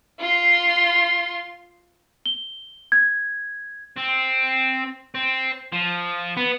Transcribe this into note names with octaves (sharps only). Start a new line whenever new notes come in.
F4 C6
G7
G#6
C4
C4
F3
B3